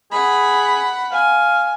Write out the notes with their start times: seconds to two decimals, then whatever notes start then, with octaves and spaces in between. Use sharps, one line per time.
0.11 G#4 F#5 B5
1.12 F5 G#5